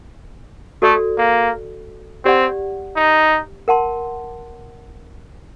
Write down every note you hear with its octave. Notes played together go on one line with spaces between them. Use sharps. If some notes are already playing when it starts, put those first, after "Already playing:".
A3 F#4 A4 D5
A#3
C4 G4 D5 F#5
D#4
A#4 F#5 A5 C6